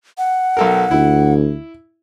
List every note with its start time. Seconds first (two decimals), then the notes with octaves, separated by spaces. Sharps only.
0.18 F#5
0.57 B1 A4 A#4
0.91 D2 E4